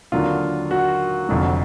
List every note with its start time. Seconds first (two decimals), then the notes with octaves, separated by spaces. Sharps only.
0.12 D#2 D3 F#3 D4 F4
0.71 F#4
1.29 F1 F2 D3 F#3